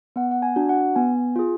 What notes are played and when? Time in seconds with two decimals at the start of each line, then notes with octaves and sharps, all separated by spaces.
0.16 B3 F#5
0.31 F#5
0.42 G#5
0.56 D4 F#4
0.69 F#5
0.96 B3 G#5
1.36 F4 G#4